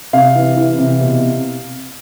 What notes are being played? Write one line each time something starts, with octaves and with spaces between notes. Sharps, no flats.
C3 F5
E3
E3
C3
B2